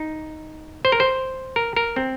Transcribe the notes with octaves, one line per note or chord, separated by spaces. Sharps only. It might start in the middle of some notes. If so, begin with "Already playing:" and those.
Already playing: D#4
C5
A#4
C5
A#4
A#4
C4